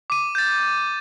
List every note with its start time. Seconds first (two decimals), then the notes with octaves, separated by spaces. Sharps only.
0.10 D6 D#7
0.35 G6 A6